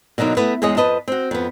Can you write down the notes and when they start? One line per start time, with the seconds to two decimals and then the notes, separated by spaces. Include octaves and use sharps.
0.18 B2 D3 F#3 A#3 D#4
0.37 A3 B3 E4 B4
0.62 E2 G#3 G#4 C#5 D#5
0.77 F2 B4 D#5 A5
1.08 C4 F#4
1.31 F2 B3